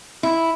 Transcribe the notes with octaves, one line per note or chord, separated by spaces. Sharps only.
E4